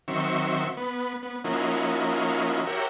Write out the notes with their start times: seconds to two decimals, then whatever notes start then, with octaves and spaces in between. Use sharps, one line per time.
0.08 D#3 F#3 C4 E5 C#6
0.77 B3
1.23 B3
1.44 F3 A#3 C#4 D#4 E4 F#4
2.67 F#4 G4 A#4 C#5 E5